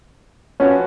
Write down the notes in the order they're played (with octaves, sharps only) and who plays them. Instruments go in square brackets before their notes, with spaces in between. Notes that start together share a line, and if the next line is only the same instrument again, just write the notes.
[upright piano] F3 B3 F#4 [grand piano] C#4